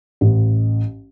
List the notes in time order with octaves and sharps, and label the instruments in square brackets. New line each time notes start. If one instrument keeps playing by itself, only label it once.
[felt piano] A1